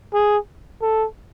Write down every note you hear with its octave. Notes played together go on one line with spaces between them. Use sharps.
G#4
A4